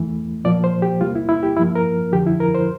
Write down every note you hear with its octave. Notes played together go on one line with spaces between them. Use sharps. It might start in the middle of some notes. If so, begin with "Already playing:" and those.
Already playing: E2 E3 A3
A#2 F3 A#3 D5
C5
G4
E2 C3 G3 A#3 F4
E4
E4
G4
G2 F3 A#3 E4
A#4
F2 D3 F3 G4
E4
A#4
C5